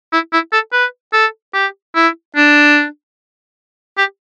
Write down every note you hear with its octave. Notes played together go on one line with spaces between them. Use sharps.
E4
E4
A4
B4
A4
G4
E4
D4
G4